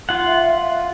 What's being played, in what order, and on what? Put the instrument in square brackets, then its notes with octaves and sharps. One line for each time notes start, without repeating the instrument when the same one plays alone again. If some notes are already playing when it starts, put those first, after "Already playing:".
[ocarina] D#4 [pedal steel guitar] F4 F#5
[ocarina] E5